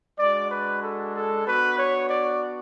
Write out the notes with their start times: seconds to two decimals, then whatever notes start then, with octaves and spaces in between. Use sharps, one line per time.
0.18 G#3 D4 F#4 D5
0.50 B4
0.82 A4
1.15 A4
1.46 B3 D4 F#4 B4
1.77 C#5
2.08 D5